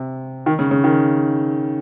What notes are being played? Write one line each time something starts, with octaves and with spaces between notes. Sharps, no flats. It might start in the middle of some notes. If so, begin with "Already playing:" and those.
Already playing: C3
D#3
C#3
C#3
D#3